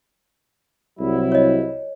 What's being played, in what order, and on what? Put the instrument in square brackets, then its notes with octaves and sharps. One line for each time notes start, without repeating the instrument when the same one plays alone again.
[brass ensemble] C2 F#3 E4
[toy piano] C#5 D#5